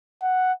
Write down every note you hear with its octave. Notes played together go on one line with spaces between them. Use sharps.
F#5